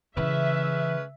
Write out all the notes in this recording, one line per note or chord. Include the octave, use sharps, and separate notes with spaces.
C#3 E3 G#3 C#4 B4 E5